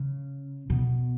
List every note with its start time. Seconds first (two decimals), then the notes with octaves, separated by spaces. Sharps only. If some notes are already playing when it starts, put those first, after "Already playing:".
Already playing: C#3
0.70 B2